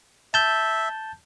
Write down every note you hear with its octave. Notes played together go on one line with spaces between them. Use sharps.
E5 A5 G6